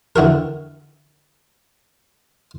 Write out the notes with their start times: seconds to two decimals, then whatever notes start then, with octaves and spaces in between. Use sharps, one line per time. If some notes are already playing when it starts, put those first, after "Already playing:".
0.16 D3 E3 F#4 A#4